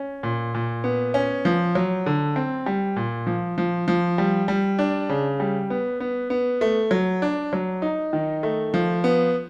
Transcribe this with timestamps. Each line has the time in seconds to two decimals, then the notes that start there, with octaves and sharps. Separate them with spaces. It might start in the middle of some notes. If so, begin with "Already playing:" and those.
Already playing: C#4
0.23 A#2
0.54 A#2
0.84 B3
1.14 C#4
1.45 F3
1.75 F#3
2.06 D3
2.36 C4
2.66 G3
2.96 A#2
3.27 F3
3.58 F3
3.88 F3
4.18 G3
4.48 G3
4.79 D4
5.09 C#3
5.40 G3
5.70 B3
6.00 B3
6.30 B3
6.61 A3
6.91 F#3
7.22 D4
7.53 F#3
7.82 D#4
8.13 D#3
8.43 A3
8.74 F3
9.04 B3